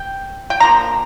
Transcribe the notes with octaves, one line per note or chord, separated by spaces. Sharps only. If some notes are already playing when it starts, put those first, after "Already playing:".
Already playing: G5
G5
D3 F3 A#3 A#5